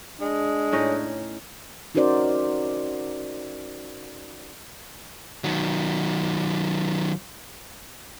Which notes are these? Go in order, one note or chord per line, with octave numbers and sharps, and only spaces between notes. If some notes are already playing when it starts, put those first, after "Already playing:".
G#3 D4
A2 C#4 D#4
C#4 D#4 F#4 A#4 C5 D5
D#3 F#3